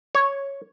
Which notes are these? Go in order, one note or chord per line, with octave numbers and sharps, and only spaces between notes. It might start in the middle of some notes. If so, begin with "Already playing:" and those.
C#5